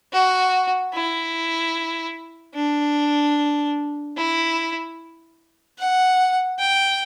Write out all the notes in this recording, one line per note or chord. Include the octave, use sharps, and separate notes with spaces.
F#4
E4
D4
E4
F#5
G5